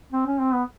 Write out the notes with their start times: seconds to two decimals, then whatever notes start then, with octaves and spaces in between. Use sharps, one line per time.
0.12 C4
0.26 C#4
0.40 C4
0.53 B3